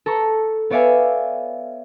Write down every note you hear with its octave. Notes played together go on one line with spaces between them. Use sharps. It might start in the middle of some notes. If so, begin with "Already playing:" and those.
A4 A#5 C#6
B3 C#5 D5 E5 F5 G#5